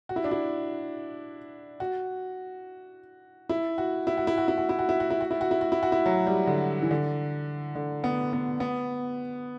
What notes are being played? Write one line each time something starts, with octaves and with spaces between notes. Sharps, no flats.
F#4
E4
D4
E4
F#4
E4
F#4
E4
F#4
E4
F#4
E4
F#4
E4
F#4
E4
F#4
E4
F#4
E4
F#4
E4
F#4
E4
F#4
E4
F#3
G3
D3
E3
D3
D3
B3
B3
B3